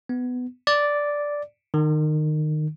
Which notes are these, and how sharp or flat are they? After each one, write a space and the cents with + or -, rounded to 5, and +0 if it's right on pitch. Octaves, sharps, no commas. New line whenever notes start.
B3 +15
D5 -5
D#3 -25